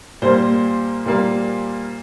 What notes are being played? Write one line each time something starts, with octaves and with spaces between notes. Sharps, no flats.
A#2 G3 A#3 C5
A#2 G3 A#3